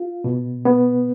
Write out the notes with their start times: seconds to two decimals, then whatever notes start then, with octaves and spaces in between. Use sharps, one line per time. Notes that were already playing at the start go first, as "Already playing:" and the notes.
Already playing: F4
0.24 B2
0.65 B3